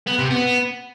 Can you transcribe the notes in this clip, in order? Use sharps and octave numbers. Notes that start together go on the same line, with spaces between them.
B3
C3
B3